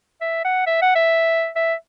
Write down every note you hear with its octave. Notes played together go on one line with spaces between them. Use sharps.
E5
F#5
E5
F#5
E5
E5